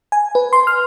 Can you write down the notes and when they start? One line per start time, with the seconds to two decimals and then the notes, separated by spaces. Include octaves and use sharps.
0.12 G#5
0.35 B4
0.53 C6
0.67 F6